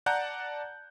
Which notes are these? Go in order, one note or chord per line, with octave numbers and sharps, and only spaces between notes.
D5 F#5 A5 A#5 F#6 G6